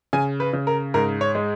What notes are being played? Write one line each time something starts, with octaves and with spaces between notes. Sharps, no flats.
C#3 G#5
B4
C#3
A#4
G#2 A#4
C#5
G#3